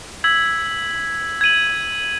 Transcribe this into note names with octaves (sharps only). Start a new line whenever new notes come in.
E6 G#6 B6 F#7
G#6 D#7 F#7